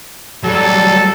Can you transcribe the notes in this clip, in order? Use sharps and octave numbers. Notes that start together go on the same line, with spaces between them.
F#3 G3 A4